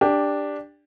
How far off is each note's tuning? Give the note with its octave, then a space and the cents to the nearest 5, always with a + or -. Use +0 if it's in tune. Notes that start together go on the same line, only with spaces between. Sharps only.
D4 +0 G4 +15